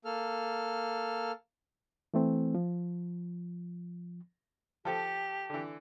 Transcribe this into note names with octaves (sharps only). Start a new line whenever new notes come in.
A#3 A4 F6
E3 A3 C4
F3
F3 G4 A4
D3 E3